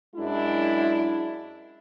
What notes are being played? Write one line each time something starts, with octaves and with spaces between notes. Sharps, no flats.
F#2 G#3 D4 E4